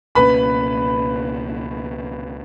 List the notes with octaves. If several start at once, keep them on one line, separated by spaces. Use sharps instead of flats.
C#2 B2 A#3 C#4 B4 B5